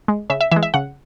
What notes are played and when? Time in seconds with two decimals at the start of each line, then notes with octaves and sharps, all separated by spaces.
0.08 G#3
0.30 C#3 E5
0.41 E5
0.52 E3 G#3 E5
0.63 E5
0.74 C#3 F#5